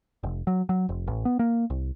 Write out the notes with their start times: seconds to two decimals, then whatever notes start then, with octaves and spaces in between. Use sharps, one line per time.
0.23 F1
0.47 F#3
0.69 F#3
0.89 F1
1.07 A1
1.25 B3
1.39 A#3
1.70 C2